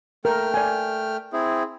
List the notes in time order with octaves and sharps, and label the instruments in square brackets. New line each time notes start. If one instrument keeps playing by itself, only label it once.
[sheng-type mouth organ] A3 G5 F6 [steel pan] A#4
[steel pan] D5 G#5
[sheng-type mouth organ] C4 E4 G#4